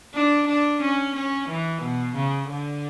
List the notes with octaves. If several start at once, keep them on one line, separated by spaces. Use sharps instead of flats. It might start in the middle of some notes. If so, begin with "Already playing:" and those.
D4
D4
C#4
C#4
E3
B2
C#3
D3